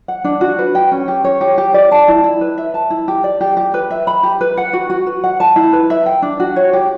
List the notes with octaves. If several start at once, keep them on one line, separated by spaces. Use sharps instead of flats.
F#5
D4
F#4
B4
G5
C#4
G4
C#5
G4
G4
D5
A5
E4
E4
B4
E5
A5
E4
G4
D5
G4
G4
B4
E5
B5
G4
B4
F#5
F#4
F#4
B4
F#5
A5
E4
B4
E5
G5
D4
F#4
C#5
G4